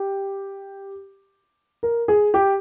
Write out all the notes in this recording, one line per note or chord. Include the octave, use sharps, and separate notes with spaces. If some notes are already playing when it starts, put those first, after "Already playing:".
Already playing: G4
A#4
G#4
G4